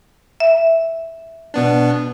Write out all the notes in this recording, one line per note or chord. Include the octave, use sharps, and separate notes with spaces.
E5
B2 B3 D4